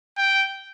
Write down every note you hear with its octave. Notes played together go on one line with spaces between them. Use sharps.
G5